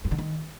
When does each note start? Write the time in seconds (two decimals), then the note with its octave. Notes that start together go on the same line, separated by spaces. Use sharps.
0.05 G2
0.12 D3
0.19 D#3